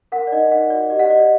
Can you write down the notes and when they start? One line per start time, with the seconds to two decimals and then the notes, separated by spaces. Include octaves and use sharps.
0.12 A#4 F#5
0.27 D5
0.32 D#4 D#5
0.51 D#4 F#5
0.70 F#4 D5
0.90 G4 D#5
0.99 F#5
1.10 G4 D#5
1.19 D5